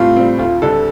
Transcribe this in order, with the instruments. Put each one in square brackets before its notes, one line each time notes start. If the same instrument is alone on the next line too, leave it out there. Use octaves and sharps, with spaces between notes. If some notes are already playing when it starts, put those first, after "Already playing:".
Already playing: [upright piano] A2 G3 C4 [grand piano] F4
[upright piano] G3 C4
[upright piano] D2 [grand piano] F4
[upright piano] D3 G3 D4 [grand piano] A4